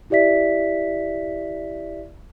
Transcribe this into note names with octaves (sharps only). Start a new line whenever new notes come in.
E4 G4 D5 E5 B6